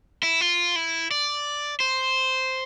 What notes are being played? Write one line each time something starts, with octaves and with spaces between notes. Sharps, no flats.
E4
F4
E4
D5
C5